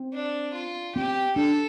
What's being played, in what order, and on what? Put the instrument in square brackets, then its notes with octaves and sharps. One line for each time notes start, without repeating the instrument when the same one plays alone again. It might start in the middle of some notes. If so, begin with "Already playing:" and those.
Already playing: [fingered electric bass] C4
[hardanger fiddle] D4
F4
[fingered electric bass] C4 [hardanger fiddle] G4
[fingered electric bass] D4 [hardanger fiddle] A4